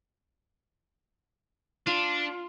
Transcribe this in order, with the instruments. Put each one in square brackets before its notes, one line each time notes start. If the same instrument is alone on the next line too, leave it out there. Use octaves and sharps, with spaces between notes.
[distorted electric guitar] D4 [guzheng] F4